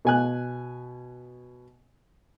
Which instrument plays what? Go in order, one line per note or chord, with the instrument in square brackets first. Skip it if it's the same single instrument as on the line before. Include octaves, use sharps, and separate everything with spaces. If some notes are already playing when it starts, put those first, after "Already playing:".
[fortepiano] B2 G#5 F#6